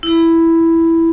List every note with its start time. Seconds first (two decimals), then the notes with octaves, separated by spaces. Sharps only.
0.03 E4